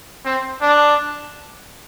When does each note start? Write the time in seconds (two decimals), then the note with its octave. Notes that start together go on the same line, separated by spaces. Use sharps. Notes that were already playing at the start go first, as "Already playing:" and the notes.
0.25 C4
0.61 D4